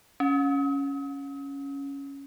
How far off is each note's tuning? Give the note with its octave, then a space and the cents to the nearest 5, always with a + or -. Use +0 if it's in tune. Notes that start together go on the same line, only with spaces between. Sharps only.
C#4 +5